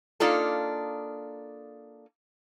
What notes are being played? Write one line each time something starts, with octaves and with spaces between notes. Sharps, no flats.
A#3 D4 D#4 F4 A4